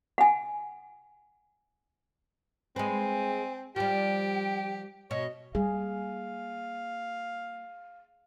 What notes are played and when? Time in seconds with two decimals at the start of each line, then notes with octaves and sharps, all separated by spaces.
0.18 F#5 G#5
2.76 G#3 C4 B4 G#5
3.76 F3 G3 G4 G5
5.11 B2 C#5 D#5
5.55 G3 A#3 G#4 F5